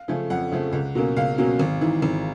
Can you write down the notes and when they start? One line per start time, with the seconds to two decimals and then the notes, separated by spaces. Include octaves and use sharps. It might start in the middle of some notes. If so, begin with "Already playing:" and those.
Already playing: F5
0.08 C#3 F3 A3 C#4
0.30 F2 F#5
0.51 C#3 F3 A3 C#4
0.73 C#2
0.95 B2 F#3 A#3 C#4
1.16 C#2 F5
1.38 B2 F#3 A#3 C#4
1.59 G#1
1.81 G#2 E3
2.02 G#1